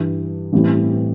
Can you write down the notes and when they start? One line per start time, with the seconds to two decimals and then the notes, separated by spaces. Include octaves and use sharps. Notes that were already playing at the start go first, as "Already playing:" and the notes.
Already playing: G2 E3 G3
0.53 A1 A2 E3 G3 C4